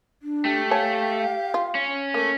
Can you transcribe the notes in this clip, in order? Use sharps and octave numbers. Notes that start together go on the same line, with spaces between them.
D4
A3 G4
C#5 F5 G#5 A5
F4
C#4
A3 A#3